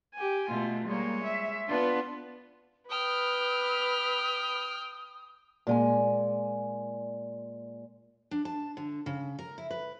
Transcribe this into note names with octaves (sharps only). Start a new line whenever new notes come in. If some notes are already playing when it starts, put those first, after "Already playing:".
G4 G#5
B2 A3 F4
G3 G#3 A#3 C#5
E5
B3 D4 F4 B4
B4 G5 D#6 F6
A#2 G#3 G#5
D4
A5
D3
C#3
A#4
E4
B4